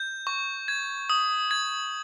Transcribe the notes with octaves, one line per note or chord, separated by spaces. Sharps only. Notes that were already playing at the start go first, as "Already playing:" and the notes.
Already playing: G6
C#6
G#6
D#6
G#6